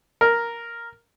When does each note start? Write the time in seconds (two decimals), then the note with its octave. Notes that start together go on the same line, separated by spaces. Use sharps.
0.21 A#4